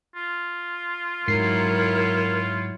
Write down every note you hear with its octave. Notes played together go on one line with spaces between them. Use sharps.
F4
G#2 F#3 E4 A#4 C#5 C7